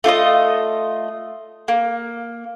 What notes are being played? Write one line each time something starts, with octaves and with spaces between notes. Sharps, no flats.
A3 F4 D5 D#5
A#3